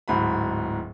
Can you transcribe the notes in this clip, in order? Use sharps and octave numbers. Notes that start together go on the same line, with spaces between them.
D1 G#2 F#4 B5